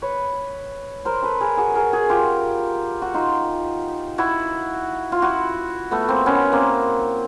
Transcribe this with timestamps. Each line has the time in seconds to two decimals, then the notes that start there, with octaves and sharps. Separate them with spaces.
0.02 B4 C#5
1.05 A#4 C5
1.23 A4 B4
1.40 G#4 A#4
1.57 F#4 G#4
1.75 G#4 A#4
1.93 F#4 G#4
2.09 F4 G4
3.02 F#4
3.14 D#4 F4
4.18 E4 F#4
5.12 F4
5.22 E4 F#4
5.91 A3 B3
6.08 A#3 C4
6.26 B3 C#4
6.52 A#3 C4